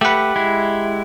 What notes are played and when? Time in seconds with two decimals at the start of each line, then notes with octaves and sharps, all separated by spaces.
0.01 A3 G4 B4 F#5
0.36 G#3 E4